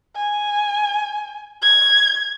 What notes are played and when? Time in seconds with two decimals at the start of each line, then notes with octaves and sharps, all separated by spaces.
0.16 G#5
1.62 G#6